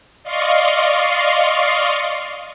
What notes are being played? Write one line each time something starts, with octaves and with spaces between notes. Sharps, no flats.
D5 D#5 F5 C6 C#6